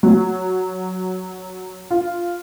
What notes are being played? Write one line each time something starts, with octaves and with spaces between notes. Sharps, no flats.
F#3
F4